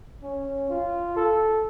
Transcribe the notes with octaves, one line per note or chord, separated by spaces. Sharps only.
C#4
F4
A4